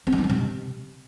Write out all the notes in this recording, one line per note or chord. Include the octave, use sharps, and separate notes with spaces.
C4
F3
D#4
F3
C3